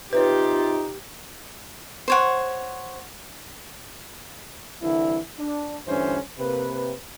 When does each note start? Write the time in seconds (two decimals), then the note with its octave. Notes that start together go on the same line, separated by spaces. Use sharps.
0.13 C3 D#4 F4 G4 B4 C#5
2.08 C5 C#5 F#5
4.82 C2 D3 E3 E4
5.38 D4
5.87 D2 G2 D3 E3 C#4 C5
6.38 C3 A#3 B4